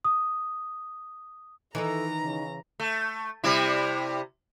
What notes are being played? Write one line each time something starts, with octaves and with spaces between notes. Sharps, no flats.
D#6
D#3 E3 D#4 E4 A4 A#5
C#3
A3
C3 G3 E4